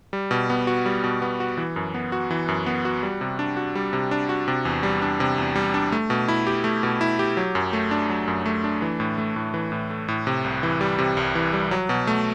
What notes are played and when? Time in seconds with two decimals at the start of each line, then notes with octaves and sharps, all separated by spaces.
0.13 G3
0.31 B2
0.50 B3
0.67 F#4
0.86 G3
1.04 B2
1.22 B3
1.40 F#4
1.57 E3
1.76 F#2
1.94 B3
2.12 F#4
2.31 E3
2.48 F#2
2.66 B3
2.85 F#4
3.03 G3
3.21 C3
3.39 D4
3.57 F#4
3.75 G3
3.93 C3
4.11 D4
4.29 F#4
4.48 C3
4.65 E2
4.83 G3
5.02 D4
5.20 C3
5.38 E2
5.56 G3
5.74 D4
5.92 A3
6.10 B2
6.28 E4
6.47 G4
6.64 A3
6.83 B2
7.01 E4
7.19 G4
7.37 F#3
7.55 F#2
7.73 A3
7.91 D4
8.09 F#3
8.28 F#2
8.46 A3
8.64 D4
8.82 E3
9.00 A2
9.18 A3
9.36 A2
9.54 E3
9.72 A2
9.90 A3
10.08 A2
10.27 C3
10.44 C2
10.63 E3
10.81 G3
10.99 C3
11.17 C2
11.35 E3
11.53 G3
11.71 F#3
11.89 B2
12.07 A3